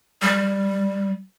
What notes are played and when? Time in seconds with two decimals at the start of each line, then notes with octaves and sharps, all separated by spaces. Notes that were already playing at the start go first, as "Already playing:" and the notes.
0.22 G3